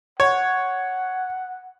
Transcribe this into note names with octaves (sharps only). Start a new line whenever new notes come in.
C#5 F#5